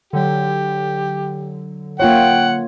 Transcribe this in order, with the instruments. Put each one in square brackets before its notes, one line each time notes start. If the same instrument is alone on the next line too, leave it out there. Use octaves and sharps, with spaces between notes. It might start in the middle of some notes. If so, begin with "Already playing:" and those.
[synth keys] D3 F#3 [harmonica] G4
[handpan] A#3 F4 C#5 [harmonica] F#5 [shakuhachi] G5